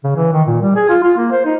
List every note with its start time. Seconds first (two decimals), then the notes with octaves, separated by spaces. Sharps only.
0.04 C#3
0.16 E3
0.33 D#3
0.47 A#2
0.62 G3
0.76 G#4
0.89 F4
1.04 F4
1.18 A#3
1.32 C5
1.46 D#4